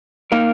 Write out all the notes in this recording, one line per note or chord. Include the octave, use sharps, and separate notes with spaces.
A#3 D#4 A#4 F5